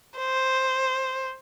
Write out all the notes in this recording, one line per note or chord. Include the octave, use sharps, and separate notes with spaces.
C5